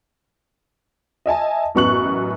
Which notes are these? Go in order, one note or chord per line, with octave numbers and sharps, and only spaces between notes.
D#5 E5 G#5 A5
A1 F#2 B3 C#6 F#6 F#7